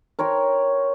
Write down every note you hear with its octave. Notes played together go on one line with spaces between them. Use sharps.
A#4 C#5 G5 C6